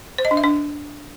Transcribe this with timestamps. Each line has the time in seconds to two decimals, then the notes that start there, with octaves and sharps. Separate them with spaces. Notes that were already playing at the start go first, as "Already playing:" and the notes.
0.18 C5
0.25 D#5
0.31 D4
0.37 E5
0.44 D4